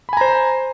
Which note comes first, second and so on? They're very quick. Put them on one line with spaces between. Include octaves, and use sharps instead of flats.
B5 G#5 A#5 C5